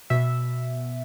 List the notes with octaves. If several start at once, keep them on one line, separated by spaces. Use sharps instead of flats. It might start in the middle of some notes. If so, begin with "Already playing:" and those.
B2 E5